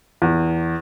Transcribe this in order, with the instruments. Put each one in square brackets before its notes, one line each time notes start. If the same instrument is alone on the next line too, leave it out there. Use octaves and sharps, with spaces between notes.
[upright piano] E2